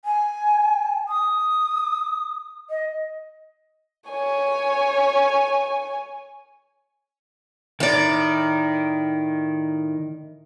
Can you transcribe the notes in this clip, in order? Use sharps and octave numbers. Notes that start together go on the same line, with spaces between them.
G#5
D#6
D#5
C#5 G#5
A2 D#3 D5